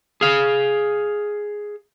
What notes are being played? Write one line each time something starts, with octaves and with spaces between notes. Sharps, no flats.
G#4 F5